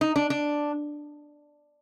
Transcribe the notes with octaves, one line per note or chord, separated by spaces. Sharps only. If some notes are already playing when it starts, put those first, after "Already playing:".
D#4
D4
D4